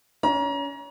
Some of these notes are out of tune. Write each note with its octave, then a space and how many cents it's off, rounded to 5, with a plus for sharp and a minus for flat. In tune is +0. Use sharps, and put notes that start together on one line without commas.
C#4 +30 A#5 +30